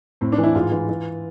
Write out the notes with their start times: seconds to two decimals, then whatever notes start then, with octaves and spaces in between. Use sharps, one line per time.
0.21 A2 C4
0.32 D4
0.38 E3
0.44 E4
0.55 G#2 F4
0.72 E3
0.89 E3